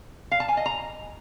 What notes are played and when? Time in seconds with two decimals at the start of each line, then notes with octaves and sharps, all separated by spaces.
0.31 F5
0.40 A5
0.49 G#5
0.57 D#5
0.66 A#5